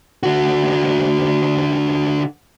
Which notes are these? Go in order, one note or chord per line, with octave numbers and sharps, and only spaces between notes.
D3 F#4